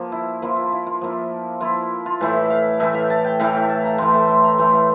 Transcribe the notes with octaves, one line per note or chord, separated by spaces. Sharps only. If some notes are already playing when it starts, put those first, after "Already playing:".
Already playing: F3 A#3
E4
F3 A#3 E4 F4
F4
E4
F4
F3 A#3 E4
F3 A#3 E4 F4
F4
A2 E3 A3 E4
F5
A2 E3 A3 E4 E5
F5
A5
G5
A2 E3 A3 E4 F5
G5
A5
A#5
A2 E3 A3 E4 C6
A5
C6
A#5
E3 A3 E4 C6
F5